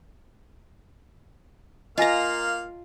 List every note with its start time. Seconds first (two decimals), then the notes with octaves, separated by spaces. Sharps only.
1.98 A#3 F4 D#5 F5 G#5 A#5 A#6